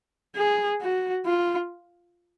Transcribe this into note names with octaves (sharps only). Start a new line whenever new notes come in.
G#4
F#4
F4